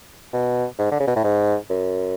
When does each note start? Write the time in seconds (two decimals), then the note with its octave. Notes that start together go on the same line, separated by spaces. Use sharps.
0.33 B2
0.79 G#2
0.92 D3
1.00 C#3
1.07 B2
1.16 A2
1.24 G#2
1.70 F#2